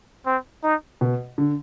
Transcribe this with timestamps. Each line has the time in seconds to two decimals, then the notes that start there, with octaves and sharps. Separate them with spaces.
0.26 C4
0.64 D#4
1.01 B2
1.38 D3